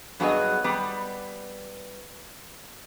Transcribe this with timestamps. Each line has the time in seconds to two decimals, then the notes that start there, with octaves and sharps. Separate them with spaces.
0.20 G2 F#3 B3 G#4 D#5
0.64 G3 B3